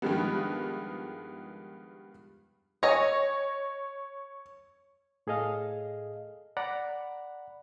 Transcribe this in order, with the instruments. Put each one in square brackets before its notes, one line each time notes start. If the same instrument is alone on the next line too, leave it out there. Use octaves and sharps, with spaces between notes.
[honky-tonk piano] G2 D#3 F3 G#3 B3
[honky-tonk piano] C#5 [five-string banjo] D#5 G#5 A#5
[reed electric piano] A2 G#4 A4 D#5 F5
D5 F#5 A#5 B5